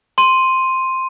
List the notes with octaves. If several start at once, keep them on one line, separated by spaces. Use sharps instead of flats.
C6 D#7